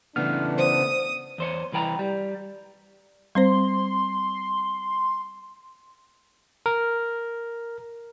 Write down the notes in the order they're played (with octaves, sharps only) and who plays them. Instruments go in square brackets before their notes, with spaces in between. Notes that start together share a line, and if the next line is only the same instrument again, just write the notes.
[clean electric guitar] C#3 A3 B3 [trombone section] E3 D4 [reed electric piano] F6
[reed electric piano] C5 [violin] D#6
[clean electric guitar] E2 C5 C#5
C2 E3 B4 G5 A#5
G3
[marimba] G3 C4 C5 [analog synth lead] C6
[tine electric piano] A#4